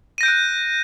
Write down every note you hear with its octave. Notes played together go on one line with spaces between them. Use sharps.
F#6 G6 A#6 D7 D#7